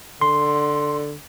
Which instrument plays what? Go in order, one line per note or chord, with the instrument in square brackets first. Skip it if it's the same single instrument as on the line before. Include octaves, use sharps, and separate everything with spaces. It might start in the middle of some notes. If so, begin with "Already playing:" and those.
[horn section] D3 [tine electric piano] C6